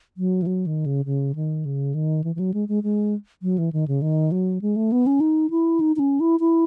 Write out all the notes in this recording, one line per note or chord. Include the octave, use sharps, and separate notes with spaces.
F#3
E3
F#3
D#3
C#3
C#3
D#3
C#3
D#3
E3
E3
F#3
G#3
G#3
G#3
F#3
E3
D#3
C#3
D#3
F#3
G#3
A3
B3
C#4
D#4
E4
D#4
D#4
C#4
E4
E4